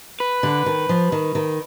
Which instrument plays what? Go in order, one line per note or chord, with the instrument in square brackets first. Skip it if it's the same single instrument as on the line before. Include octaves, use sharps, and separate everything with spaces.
[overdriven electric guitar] B4
[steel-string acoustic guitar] D3
D#3
F3
D#3
D#3